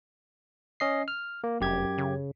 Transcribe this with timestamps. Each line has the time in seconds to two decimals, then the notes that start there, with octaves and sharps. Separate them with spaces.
0.80 C#4 D#5 C7
1.08 F6
1.44 A#3
1.61 F1 F#2 G4 G#6
1.98 C#3